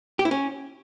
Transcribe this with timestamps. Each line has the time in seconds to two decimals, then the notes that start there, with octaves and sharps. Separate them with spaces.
0.19 G4
0.25 E4
0.31 C#4